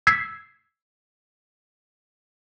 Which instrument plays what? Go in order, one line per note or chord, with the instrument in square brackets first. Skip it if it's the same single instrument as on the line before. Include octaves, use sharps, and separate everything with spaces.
[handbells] E6 G#6 B6 C7